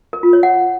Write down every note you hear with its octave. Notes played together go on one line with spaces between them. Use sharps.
A#4
F4
C#5
F#5